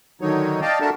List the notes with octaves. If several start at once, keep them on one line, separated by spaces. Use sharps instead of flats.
D3 D#3 F#3 D#4 C#5
D5 D#5 F5 G5 A5
D4 F#4 A4 A#4 E5 A5